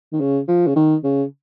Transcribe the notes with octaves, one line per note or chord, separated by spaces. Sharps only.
D#3
C#3
F3
C#3
D#3
C#3